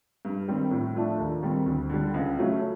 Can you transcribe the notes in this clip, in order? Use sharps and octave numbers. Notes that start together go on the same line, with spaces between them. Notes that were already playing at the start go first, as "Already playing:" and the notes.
G2
D#3 G3 C4
A2
F3 A3 D4
D#2
D#3 G3 C4
D2
D3 G3
C#2
C#3 F#3 A3 C#4